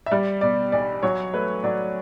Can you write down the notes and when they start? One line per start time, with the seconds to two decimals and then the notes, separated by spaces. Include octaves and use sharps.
0.06 E5
0.11 G3 D5
0.41 B2 D5
0.72 B1 D5
1.03 F#3 C#5
1.34 A3 B4
1.64 F#3 D5